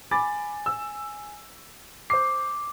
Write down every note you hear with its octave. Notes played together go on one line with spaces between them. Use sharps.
G#5 B5 D6 A6
E6
C5 D6 C7